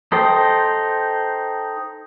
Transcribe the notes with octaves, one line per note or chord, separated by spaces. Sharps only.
D#4 A4 C5 G5